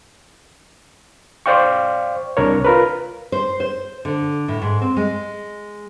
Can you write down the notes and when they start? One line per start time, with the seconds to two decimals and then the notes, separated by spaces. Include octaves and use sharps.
1.46 C5 D5 F5 G5 C#6
2.37 C2 D4 A#4 C#5
2.65 F4 A#4 B4
3.32 C5
3.60 C5
4.05 D3
4.48 A2
4.62 G#2
4.82 C4
4.97 G#3